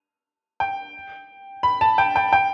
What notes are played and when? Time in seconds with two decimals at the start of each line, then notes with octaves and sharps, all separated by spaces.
0.60 G5
1.63 B5
1.81 A5
1.98 G5
2.16 G5
2.33 G5